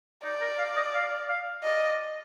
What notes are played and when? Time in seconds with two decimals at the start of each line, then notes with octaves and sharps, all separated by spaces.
0.24 D#4 D5
0.41 A#4
0.58 F5
0.76 D#5
0.94 F5
1.29 F5
1.63 D5 D#5